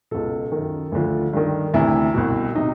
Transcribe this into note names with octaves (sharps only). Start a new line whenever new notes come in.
C#2 B2 A4
F#2 D#3
D2 D3 F3
G2 D#3
D2 C3 E3 E4
C2 B2
C3 D#4